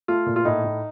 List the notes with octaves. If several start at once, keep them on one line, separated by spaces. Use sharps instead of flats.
A3 F4
A#2
F4
A2 D#4
A2